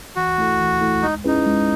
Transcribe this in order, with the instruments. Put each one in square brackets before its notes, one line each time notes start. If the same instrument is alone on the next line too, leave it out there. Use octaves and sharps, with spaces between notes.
[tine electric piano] E3 [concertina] F#4
[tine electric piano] A3 E4 A4
E3
A3 E4 A4
[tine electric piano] G#3 [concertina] D#4
[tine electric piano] C#4 E4 G#4 B4 [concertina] D#4
[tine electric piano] G#3